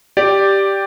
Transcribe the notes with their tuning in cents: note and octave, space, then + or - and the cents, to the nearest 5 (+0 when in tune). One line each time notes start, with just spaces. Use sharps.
G4 +0 D5 +0